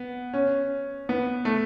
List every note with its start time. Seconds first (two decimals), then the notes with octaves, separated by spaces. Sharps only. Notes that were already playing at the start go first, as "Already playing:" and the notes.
Already playing: B3
0.34 C#4
1.09 B3
1.45 A3